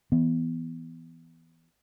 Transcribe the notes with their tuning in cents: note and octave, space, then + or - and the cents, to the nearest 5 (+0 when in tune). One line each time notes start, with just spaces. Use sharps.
E3 +0 B3 +0